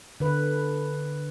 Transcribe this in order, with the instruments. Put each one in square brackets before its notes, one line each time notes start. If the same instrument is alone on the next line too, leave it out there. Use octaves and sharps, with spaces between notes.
[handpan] D3 B4